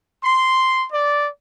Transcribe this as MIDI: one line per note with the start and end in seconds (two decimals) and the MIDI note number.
0.23 0.85 84
0.92 1.28 74